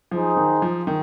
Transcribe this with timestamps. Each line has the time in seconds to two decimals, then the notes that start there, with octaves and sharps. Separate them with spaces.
0.11 F3 D#4 G#4 C5
0.36 D#3
0.62 F3
0.87 D#3